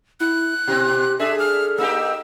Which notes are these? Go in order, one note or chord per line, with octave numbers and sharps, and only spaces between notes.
E4 F#6
B2 C4 G4
D4 G#4 A4 E5
F6
A#3 D#4 G4 E6